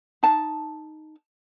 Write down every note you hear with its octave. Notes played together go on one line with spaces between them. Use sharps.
D#4 A5